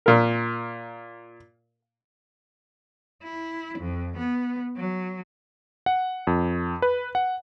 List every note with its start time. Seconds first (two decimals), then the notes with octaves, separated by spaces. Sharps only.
0.06 A#2 A#4
3.23 E4
3.78 F2
4.17 B3
4.76 F#3
5.86 F#5
6.27 F2
6.82 B4
7.15 F#5